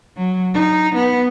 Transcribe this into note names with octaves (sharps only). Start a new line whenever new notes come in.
F#3
D#4
B3